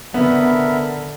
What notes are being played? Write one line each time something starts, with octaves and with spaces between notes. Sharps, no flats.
D3 B3 A#4 E5 B5